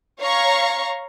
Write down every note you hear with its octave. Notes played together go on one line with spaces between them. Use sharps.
C#5 F5 A#5 C#6